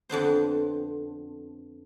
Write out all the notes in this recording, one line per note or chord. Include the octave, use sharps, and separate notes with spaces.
F2 D3 B3 C5